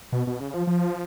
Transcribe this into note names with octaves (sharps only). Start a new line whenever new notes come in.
B2
B2
C#3
F3
F3